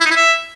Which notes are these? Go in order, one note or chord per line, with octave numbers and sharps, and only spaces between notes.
E4
D#4
E4
E5